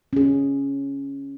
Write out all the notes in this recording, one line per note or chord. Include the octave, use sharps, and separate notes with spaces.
C#4 G#4